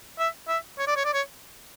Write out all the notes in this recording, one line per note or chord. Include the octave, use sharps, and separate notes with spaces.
E5
E5
C#5
D5
C#5
D5
C#5